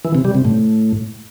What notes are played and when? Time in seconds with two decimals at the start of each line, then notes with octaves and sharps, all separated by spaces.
0.05 E3
0.15 C3
0.25 G3
0.35 C3
0.45 A2